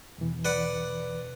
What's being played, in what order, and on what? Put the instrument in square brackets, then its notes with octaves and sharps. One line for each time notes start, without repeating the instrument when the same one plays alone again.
[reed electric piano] E2 B2 E3
[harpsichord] B4 D5 F#5